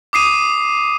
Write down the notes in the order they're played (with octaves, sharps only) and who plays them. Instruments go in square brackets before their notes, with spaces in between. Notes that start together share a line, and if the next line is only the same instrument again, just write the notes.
[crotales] D6 D#6 C7 D#7